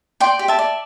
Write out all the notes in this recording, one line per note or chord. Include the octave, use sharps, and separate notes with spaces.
D5 G5 C6
G4
E5 A5
D5